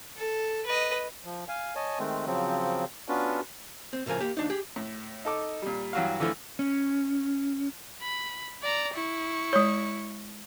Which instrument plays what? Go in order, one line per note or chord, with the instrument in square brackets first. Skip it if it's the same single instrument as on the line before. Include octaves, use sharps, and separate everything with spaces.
[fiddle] A4
B4 D#5
[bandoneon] F3
F5 G#5
C#5 D#5 G#5 A5
D#3 G#3 A3 C4
C#3 F3 F#3 C4
B3 C#4 D4 F4 F#4 B4
[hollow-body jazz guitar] C4
A2 C#3 F3 A#4 G#5
A#3 G4
D#2 D4 D#4
G4 G#4
[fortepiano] A2
D#4 A4 D6
A#2 G3
G2 E3 F#3 F#4 F5
D3 E3 F3 A3
[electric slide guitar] C#4
[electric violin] B5
D5 A#5
E4 C#6
[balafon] G#3 C#5